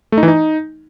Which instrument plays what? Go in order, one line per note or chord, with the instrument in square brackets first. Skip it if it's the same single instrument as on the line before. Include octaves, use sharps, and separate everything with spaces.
[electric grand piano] A3
D#4
E3
D#4